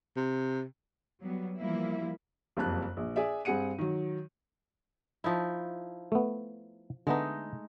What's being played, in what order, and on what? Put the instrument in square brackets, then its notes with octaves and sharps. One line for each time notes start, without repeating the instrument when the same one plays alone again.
[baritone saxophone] C3
[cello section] F#3 G3 B3
E3 F3 G3 A#3 E4
[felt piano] F#1 F2 G3 A5 F#6
A#1
G#4 D5 E5
G2 C4 G#4 F#5 C#7 D#7
D#3 F#3
[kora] F3 D#4 E4
[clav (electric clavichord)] A3 B3
[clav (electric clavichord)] D3 B3 [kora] G#3 A3 D#4